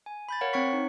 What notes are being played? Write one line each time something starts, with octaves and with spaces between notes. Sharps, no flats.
G#5
B5 G6 A6
A#4 C#5 F5 F#5
C4 C#5 F#5 C#6 B6
D#4